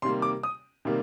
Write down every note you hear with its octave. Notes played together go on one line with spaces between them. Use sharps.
C3 D#3 G3 A#3 C6
D6
D#6
C3 D#3 G3 A#3